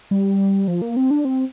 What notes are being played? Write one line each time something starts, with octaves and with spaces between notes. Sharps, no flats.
G3
F3
A#3
C4
D4
C4